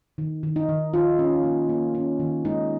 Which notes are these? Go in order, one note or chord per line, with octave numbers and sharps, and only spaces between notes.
D#3
D#3
D#4
D#3
D#3 F4
C#4
A#3
A#3
C#4
D#3
G#3 D#4